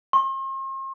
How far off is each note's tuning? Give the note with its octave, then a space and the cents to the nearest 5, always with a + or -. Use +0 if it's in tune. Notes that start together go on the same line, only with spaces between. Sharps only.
C6 +45